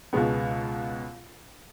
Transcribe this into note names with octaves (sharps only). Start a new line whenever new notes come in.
C#2 B2 G#3 B3